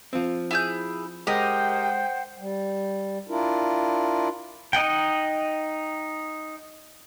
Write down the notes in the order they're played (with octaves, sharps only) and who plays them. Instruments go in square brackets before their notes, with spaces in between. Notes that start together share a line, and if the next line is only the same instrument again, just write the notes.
[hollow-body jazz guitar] F3 C4
[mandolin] E4 G#4 G6
[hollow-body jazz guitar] G#3 [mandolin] G4 A#4 D#5 [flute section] C5 F#5 G5
[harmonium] G3
D4 E4 F4 A#4
[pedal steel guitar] D#4 D#5 F#5 G5